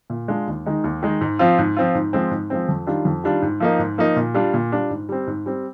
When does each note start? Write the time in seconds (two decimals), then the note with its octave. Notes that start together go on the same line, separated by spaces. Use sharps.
0.10 A#2
0.28 G#3 D4 F4
0.47 D#2
0.66 D#3 G#3 D#4
0.84 D#2
1.03 D#3 G#3 D#4
1.21 G#2
1.39 F3 C4 F4
1.59 G#2
1.77 F3 C4 F4
1.95 G#2
2.13 F3 G#3 C4
2.31 G#2
2.50 F3 G#3 C4
2.69 F2
2.87 D#3 G3 D4 F4
3.05 F2
3.24 D#3 G3 D4 F4
3.42 G#2
3.60 F3 A#3 D#4
3.79 G#2
3.98 F3 A#3 D#4
4.16 A#2
4.34 G3 D4 F4
4.54 A#2
4.72 G3 D4 F4
4.90 G#2
5.09 G3 C4
5.27 G#2
5.46 G3 C4